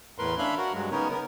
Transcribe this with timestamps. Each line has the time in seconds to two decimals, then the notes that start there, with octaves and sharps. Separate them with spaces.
0.18 E2 A2 A#4 B4 C6
0.38 C#4 D4 E5 F5 B5
0.58 F#4 A#4
0.73 G2 F#3 G#3
0.91 C#3 B3 C#4 D#4 A#4
1.11 B3 A#4